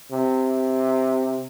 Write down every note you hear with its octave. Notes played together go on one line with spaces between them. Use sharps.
C3